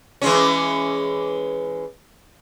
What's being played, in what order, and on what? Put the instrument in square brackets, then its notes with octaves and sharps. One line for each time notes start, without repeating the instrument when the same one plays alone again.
[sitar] E3 G#3 C#4